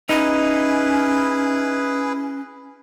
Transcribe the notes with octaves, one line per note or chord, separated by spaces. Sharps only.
C#4 D#4 E4 G#4 B4